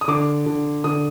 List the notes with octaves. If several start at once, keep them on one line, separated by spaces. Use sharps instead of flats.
D#6
D3 D6
D3
D3 D#6